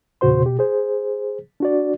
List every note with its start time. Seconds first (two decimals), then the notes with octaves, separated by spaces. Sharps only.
0.21 E2 A#2 C#3 F#4 C5 C6
0.43 B2 G4
0.59 G#4 C5
1.60 D4 F#4 D5